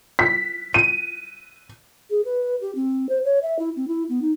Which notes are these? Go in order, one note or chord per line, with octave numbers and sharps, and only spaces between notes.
B6
D#7
G#4
B4
G4
C4
C5
C#5
E5
E4
C4
E4
B3
D#4